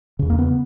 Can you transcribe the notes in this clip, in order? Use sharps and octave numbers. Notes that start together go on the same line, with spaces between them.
E2 C#3
A#3
B3